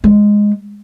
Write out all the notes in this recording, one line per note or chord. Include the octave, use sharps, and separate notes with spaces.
G#3